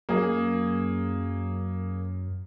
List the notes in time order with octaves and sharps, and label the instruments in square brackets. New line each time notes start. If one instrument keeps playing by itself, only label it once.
[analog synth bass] F#2 [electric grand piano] A#3 G#4